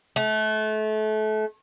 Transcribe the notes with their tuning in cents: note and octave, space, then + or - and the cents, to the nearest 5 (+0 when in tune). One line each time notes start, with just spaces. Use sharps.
A3 -30